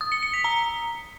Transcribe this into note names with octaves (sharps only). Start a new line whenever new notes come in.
D#6
C#7
C#7
B6
A#5